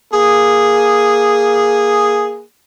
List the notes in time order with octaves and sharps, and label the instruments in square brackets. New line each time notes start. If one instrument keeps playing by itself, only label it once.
[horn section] A#3 G#4